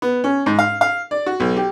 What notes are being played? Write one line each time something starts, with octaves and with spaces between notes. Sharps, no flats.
B3
C#4
G#2
F5
F5
D5
F#4
B1
G4